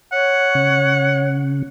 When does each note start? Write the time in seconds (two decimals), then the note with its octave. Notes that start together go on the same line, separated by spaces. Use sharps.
0.12 C#5 F#5
0.55 C#3